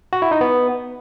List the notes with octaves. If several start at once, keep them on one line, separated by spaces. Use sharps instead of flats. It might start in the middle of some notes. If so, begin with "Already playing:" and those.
F#4
E4
D#4
B3